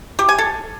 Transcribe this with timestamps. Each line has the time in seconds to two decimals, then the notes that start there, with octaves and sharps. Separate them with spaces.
0.19 G4
0.29 G#5
0.38 A4